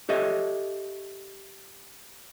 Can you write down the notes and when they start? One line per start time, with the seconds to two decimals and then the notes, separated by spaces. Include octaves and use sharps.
0.09 G4 A4 C#5 D#5 E5